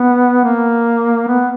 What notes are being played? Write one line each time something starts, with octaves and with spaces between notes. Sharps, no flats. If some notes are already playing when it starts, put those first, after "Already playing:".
Already playing: B3
A#3
B3